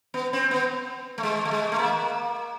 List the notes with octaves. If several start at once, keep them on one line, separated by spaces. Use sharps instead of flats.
B3
C4
B3
A3
G#3
A3
G#3
A3
A#3